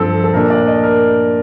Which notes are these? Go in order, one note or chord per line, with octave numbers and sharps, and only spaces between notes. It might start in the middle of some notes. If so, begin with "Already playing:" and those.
Already playing: G2 F3 C4 A4
A4
A#2 A3 D4 A#4
D5
D#5
A#4